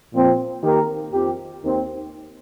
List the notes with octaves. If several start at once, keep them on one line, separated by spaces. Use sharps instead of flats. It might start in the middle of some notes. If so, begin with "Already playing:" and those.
A#2 F3 C4
D#3 A#3 G4 A#4
F2 F3 C4 G4
D#2 D#3 C4